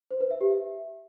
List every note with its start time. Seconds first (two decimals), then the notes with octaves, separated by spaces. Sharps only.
0.11 C5
0.21 B4
0.31 E5
0.41 G4
0.51 E5